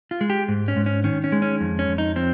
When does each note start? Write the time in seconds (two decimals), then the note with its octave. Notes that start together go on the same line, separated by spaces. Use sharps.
0.11 F4
0.21 G#3
0.30 G4
0.48 G#2
0.68 C#4
0.77 G#2
0.86 C#4
1.04 D#3 C#4
1.24 C#4
1.32 G#3
1.42 C#4
1.61 F2
1.79 C#4
1.88 F2
1.98 D#4
2.16 F3 C4